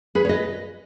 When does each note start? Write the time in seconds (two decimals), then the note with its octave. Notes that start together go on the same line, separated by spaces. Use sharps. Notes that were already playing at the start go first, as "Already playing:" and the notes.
0.15 G#4 B4
0.25 C#5
0.29 B4 D#5